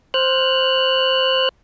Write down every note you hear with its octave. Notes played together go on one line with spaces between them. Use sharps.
C5 F6 F#6